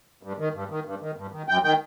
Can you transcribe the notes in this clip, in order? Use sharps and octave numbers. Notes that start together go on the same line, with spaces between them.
G2
D#3
G2
D#3
G2
D#3
G2
D#3
F#2 G5
D#3 G5